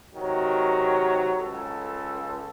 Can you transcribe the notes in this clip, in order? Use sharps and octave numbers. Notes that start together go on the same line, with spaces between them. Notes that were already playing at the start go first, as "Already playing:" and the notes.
C3 D#3 F#3
C#2 A4